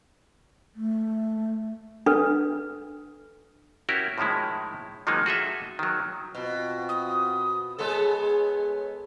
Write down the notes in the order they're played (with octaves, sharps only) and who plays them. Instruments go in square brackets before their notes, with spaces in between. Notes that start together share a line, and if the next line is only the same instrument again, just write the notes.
[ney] A3
[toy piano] D4 A4 B4
[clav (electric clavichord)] C#4 E4 F#4 G4 A#4
A2 D#3 F3 G#3 E4
D#3 F3 F#3 G#3 A#3 D#4
F#4 G#4 A4 E5
D#3 F#3
[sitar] B2 [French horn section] C4 F4 F#4
[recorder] D#6
[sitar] G#3 B3 A4 [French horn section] G#4 [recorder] C#5